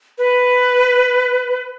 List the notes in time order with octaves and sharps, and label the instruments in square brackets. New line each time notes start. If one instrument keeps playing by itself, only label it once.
[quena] B4